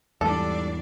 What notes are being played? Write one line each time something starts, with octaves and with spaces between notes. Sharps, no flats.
E2 G#2 E3 G3 D4 A4 D5